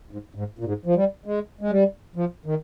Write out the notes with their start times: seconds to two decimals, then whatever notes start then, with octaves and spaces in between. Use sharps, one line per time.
0.11 G#2
0.35 G#2
0.59 A#2
0.64 G#2
0.86 F3
0.95 G3
1.26 G#3
1.61 G#3
1.70 G3
2.16 F3
2.46 D#3